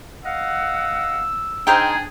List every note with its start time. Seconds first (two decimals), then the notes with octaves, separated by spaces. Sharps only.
0.25 D#5 F5 F#5 E6
1.67 D4 D#4 G#4 A#4 C5 G5